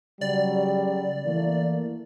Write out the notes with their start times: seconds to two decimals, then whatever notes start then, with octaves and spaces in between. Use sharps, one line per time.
0.21 C#3 F#3 G3 D5
1.26 E3 A3 A#3